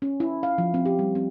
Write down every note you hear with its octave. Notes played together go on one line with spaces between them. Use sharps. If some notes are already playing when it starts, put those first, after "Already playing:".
C#4
E4
F5
F3
C4
G4
G3
C4